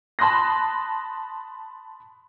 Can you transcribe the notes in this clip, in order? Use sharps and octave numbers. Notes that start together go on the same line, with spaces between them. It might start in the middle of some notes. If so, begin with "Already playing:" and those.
A5 B5 C6 D#6 F#6 A#6